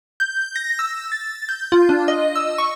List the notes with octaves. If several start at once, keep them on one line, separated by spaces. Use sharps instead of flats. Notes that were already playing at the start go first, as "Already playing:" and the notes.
G6
A#6
E6
A6
G6
F4
D4
D#5
E6
C#6